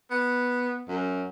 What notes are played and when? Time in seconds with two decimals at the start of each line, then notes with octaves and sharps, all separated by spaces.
0.11 B3
0.88 F#2